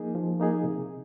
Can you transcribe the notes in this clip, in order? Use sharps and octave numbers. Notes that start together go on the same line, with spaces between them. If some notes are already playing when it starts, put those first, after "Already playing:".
Already playing: F3 A#3 D#4 G#4
F3
A#3 D#4 G#4
C3